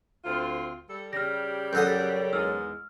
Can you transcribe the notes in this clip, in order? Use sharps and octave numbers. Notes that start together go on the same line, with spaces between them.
D2 C4 F4
G3 A4
C#3 G3 G4 F6 A#6
F#2 A4 F#5 D#6 F#6 G6
E2 G#2 G#3 E6 F6